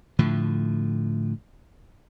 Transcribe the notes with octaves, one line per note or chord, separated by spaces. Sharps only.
A2 D3 F3